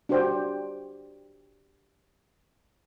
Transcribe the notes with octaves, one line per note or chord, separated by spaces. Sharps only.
D4 F#4 G4 C5 D5 G5